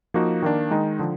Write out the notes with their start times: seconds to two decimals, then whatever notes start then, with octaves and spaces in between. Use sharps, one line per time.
0.14 F3 A#3 D#4 F#4
0.42 D#3 A#3 D4
0.71 D#3 G#3 D#4
0.99 D3 F3